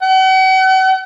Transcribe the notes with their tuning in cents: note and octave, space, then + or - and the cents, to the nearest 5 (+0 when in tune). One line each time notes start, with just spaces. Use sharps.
F#5 +40